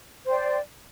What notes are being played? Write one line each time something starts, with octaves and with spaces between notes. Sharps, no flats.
C5 D5 G5